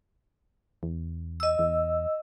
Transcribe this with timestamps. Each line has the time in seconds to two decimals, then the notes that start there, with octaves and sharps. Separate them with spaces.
0.83 E2
1.40 D#5 E6
1.59 E2